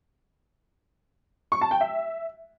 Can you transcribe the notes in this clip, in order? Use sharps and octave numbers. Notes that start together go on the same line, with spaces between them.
C#6
A5
G5
E5